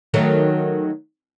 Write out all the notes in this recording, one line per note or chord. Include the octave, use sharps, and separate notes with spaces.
D#3 F#3 A3